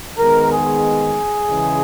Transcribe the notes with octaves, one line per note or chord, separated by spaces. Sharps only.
D#3 G#3 B3 A#4
G#4
C#3 E3 G#3